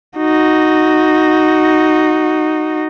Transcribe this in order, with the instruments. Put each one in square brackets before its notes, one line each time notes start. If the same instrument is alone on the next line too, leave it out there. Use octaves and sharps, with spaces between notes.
[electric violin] D#4 F#4